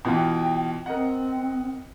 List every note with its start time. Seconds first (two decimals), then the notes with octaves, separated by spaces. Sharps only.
0.05 B2 E3 F4 G5
0.86 C4 A#4 D#5 F#5